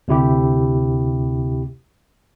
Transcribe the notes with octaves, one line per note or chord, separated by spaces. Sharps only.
D2 C3 E4 G4